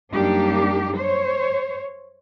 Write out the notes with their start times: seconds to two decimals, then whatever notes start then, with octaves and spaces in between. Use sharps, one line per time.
0.14 F#2 G3 A#3 D4 D#4 G4
0.95 C5 C#5